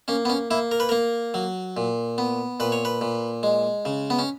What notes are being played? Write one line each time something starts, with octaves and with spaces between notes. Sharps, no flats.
A#3 C#4
B3
C#4
A#3 E4
A#4
B4
A#3 A#4
F#3
A#2
B3
A#2 B4
C#5
B4
A#2
G#3
C#3
B3
C#4